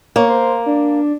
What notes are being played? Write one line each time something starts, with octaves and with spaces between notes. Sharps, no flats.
A#3 C#5
C5
D4